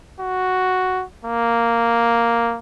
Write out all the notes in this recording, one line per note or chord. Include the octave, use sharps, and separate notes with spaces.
F#4
A#3